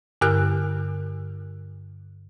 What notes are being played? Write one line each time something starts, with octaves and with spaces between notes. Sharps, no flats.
G2 D3 G4 A#4 F6 F#6